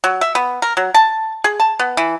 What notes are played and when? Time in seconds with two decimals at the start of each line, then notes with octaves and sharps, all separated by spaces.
0.04 F#3
0.21 E5
0.35 B3
0.62 A#4
0.77 F#3
0.94 A5
1.44 G#4
1.60 A5
1.79 B3
1.97 E3